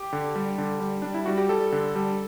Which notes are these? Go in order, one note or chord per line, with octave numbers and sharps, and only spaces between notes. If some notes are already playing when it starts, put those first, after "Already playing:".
Already playing: G4
D3
G3
D3
G3
G3 D4
E4
G3 F#4
G4
G3 A4
D3
G3